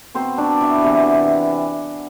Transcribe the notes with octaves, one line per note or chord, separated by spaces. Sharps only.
B2 B3 C4 C5
D4 D5
E4 E5
C3 E3 B3